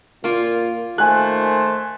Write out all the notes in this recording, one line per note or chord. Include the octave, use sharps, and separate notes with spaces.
A#2 A#3 F4
D#3 A3 C5 G#5 F#6